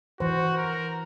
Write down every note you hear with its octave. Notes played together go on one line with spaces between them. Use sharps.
E3 F#4 C5
A#4